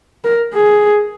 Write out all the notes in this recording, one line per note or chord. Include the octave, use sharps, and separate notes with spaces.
A#4
G#4